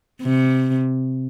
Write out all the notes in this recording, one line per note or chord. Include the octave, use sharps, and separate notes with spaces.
C3